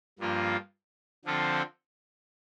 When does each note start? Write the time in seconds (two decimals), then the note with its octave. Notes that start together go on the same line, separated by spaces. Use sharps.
0.19 G2 F3 A#3 F4
1.25 D3 F3 C4 F4 A4